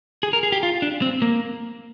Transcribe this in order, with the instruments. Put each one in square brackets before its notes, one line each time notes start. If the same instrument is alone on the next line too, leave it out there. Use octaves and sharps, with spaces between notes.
[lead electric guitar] G#4
A#4
G#4
G4
F4
D4
C4
A#3